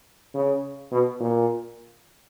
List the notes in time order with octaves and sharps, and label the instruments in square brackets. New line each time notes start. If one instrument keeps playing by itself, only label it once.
[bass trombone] C#3
B2
A#2